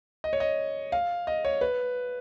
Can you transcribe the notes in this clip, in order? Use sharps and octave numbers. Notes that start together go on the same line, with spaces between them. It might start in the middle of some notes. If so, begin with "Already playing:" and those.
D#5
C#5
D#5
F5
D#5
C#5
B4